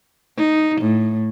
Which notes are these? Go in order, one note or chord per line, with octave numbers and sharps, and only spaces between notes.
D#4
A2